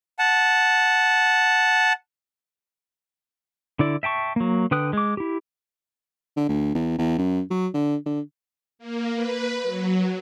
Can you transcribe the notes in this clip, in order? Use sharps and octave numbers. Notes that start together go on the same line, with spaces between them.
F#5 A5
D3 E4 D5
E5 G5 A5 C#6
F#3 A#3
D3 B4 G5 D#6 F#6
G#3 D6
E4 G4
D3
D2
E2
E2
F#2
F#3
D3
D3
A#3
B4
F#3